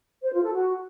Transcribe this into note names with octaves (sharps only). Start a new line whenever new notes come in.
C5
F4
A4
F#4